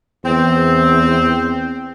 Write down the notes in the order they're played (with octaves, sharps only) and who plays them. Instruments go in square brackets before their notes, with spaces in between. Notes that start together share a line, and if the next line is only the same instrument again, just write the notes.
[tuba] E2 [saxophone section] C4